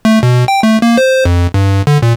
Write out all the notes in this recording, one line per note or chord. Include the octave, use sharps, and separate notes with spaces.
A3
B2
G5
A3
A#3
C5
F2
G2
D3
A#2